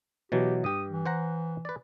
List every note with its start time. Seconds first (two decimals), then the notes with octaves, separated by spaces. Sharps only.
0.32 B2 E3 F#3 G4
0.64 G2 G4 D#6
0.87 E3
1.06 C5 F#5 A#5
1.65 B4 D5